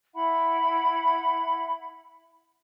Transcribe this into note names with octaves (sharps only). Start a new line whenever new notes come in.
E4 E5 F#5 B5